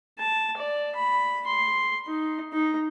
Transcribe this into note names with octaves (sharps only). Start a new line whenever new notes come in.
A5
D5
B5
C6
D#4
D#4